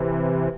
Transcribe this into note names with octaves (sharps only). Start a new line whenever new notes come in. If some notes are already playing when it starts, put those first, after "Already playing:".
Already playing: C3 E3